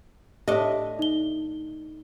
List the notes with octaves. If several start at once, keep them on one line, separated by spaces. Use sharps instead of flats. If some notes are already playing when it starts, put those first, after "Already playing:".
A2 D4 G4 D#5 E5
D#4 G7